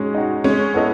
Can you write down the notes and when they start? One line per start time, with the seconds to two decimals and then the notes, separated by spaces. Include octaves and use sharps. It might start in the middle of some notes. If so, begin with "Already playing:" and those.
Already playing: G#3 C#4 D#4 F#4
0.15 D#4 F#4
0.44 G#3 C#4
0.74 B3 E4 A4 D#5